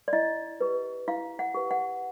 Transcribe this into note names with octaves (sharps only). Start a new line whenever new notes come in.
D5
E4 D#5
G4 B4
E4 F5
F#5
G4 B4
F#5